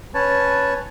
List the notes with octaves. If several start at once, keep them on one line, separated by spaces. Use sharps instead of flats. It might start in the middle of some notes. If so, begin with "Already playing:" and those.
C#4 B4 C#5 A5